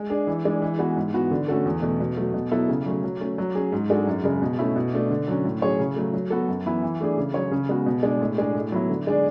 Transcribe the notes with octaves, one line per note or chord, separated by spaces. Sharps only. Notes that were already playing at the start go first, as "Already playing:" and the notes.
Already playing: G#3
D4 G#4
E3
G#3 D4
E3
G#3 B3 F#4
G#2
E3 B3 F#4
D3
A3 C#4 F#4 A4
E2
B2 A3
B2
F#3 A3
B2
F#3 B3 E4 A4
C#3
F#3 A3 C#4
F#3
A3 C#4
F#3
C#4 G#4
G#2
G#3 D4 F#4 A4
F#2
C#3 G#3
B2
A3 C#4 E4
B2
A3 D4
D3
F#3 C#4
A2
F#3 C#4 G#4 C#5
C#3
F#3 A3
F#3
B3 F#4 A4
F#2
E3 B3 E4
E3
A3 D4 G#4
C#3
F#3 C#4 G#4 C#5
C#3
G#3 B3 F#4
B2
G#3 D4
A2
G#3 D4 G#4
A2
F#3 B3 E4
D3
G#3 D4 G#4 D5